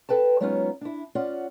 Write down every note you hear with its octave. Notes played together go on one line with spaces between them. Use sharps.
A4 B4 G5 A5
F#3 G#3 B3 C#4 D#4 F4
D4 E4
C#4 F4 D5 F#5